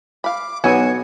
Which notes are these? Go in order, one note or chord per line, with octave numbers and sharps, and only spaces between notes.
F5 B5 D6
B1 B3 F#4 C#5 G#5